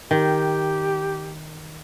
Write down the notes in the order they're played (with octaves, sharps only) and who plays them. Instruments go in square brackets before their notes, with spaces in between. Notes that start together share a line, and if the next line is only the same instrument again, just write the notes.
[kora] D#3 [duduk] G4